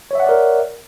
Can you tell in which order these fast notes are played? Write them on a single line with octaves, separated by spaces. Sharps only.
C#5 E5 F#5 D5 A#4